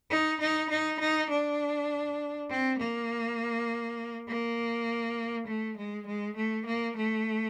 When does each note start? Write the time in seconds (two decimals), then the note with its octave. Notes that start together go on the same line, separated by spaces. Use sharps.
0.11 D#4
0.41 D#4
0.70 D#4
1.00 D#4
1.30 D4
2.50 C4
2.79 A#3
4.29 A#3
5.47 A3
5.77 G#3
6.07 G#3
6.36 A3
6.66 A#3
6.97 A3